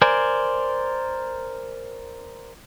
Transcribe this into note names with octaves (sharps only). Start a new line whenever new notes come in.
A#4 C5 D5 G#5